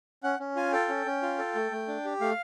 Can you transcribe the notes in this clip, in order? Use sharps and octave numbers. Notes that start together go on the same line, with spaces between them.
C#4 F#5
C#4
F4 G#5
A4 G5
C#4
C#4
F4
A4
A3
A3
D4
G4
A3 F5